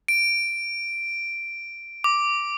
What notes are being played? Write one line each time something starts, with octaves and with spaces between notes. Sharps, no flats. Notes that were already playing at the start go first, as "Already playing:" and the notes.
D7
D6